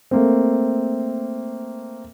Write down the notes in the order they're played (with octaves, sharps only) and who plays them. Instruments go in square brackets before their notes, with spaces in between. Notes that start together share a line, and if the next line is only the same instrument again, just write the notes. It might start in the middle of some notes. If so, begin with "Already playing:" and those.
[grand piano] A3 A#3 C4